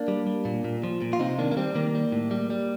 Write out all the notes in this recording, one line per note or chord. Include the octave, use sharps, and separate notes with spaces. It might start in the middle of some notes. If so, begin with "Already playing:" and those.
Already playing: A#3 D4
G3
G3
A#2
A#2
F3
A#2
F4
C3 C4 D#4
D#3 A#3 D4
A#3
G3 C4
D#3 A#3
G3
A2
G3
G3